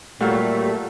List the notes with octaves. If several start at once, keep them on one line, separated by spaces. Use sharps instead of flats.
A#2 F#3 G3 A3 F5 F#5